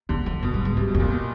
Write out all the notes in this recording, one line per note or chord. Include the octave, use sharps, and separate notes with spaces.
E2 D3
F2
F#2 B2
G2
G#2
G2 C3
B2
F2
A#2
B2